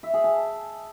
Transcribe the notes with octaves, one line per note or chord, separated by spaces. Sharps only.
E5
G#4
A5